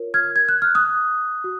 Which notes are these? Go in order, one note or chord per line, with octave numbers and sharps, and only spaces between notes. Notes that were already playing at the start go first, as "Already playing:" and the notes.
Already playing: F4 A#4 C#5
F6 G#6
G#6
F#6
F6
D#6 F#6
F#4